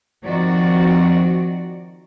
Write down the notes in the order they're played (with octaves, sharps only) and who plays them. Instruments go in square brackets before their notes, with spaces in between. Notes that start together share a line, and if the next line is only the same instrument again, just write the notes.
[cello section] D#3 F3 C4 F#4 D5